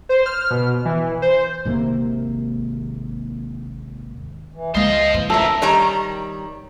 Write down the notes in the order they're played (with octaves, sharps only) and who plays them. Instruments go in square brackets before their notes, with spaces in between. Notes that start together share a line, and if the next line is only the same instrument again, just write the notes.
[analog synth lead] C5
F6
B2
E3
C5
[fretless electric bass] G#1 D#2 C3 A#3
[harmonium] E3
[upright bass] C#2 G#3 [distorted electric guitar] C5 F5 [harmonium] D#5
[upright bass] E3
[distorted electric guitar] D2 A#4 [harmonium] E4 [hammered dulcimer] A4 E5
[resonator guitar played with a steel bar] D#3 G3 C#5 A5 A#5